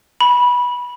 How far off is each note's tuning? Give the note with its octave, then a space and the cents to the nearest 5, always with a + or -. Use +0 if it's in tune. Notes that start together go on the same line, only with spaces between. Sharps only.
B5 -15